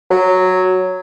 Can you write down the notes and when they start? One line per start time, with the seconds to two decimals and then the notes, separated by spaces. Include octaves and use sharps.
0.11 F#3